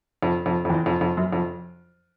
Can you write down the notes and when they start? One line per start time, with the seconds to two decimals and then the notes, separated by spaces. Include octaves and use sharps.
0.23 F2
0.46 F2
0.65 F2
0.70 E2
0.86 F2
1.01 F2
1.17 F#2
1.33 F2